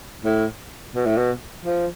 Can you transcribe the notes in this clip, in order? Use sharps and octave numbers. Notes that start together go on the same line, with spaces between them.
A2
B2
A2
B2
F3